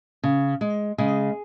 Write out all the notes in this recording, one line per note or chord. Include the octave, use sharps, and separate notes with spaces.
C#3
G#3
C#3 G#3 G#4